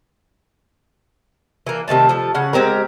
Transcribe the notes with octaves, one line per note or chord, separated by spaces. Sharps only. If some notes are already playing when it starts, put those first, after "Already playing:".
E3 A#3
C3 D#3 A3 A5
F3 A4
C#3 C#4 F#5
G#3 C4 G4 A#4